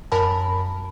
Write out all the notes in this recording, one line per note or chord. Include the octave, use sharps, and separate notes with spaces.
F#2 A#4 A5 B5